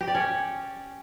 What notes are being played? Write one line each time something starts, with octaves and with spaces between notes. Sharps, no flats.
G4
D5
C#4